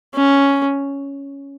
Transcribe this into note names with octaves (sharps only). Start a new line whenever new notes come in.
C#4